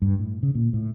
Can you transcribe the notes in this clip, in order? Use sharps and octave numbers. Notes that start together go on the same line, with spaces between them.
G2
A2
C#3
A#2
A2